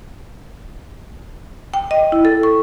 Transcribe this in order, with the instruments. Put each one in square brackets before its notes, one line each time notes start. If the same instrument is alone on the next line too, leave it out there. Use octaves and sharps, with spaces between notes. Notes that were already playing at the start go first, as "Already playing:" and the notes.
[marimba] G5
D#5
E4
A4
C#6